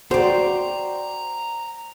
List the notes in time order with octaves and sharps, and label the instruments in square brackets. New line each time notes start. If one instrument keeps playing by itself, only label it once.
[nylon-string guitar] F#4 [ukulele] C5 [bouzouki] D5 G5 [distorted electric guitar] A#5